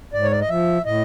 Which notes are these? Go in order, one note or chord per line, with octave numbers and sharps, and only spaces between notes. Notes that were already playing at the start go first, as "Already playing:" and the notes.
G#2 D5
C#5
D5
D#5
F3 E5
A2 D#5